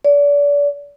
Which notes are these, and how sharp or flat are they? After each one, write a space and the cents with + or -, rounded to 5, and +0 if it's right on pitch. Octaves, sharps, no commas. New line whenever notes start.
D5 -35